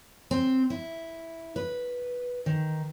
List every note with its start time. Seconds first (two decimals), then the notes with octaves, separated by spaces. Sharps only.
0.31 C4
0.70 E4
1.56 B4
2.46 D#3